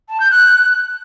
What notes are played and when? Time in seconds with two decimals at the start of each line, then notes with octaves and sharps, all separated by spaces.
0.09 A5
0.20 G6
0.31 F#6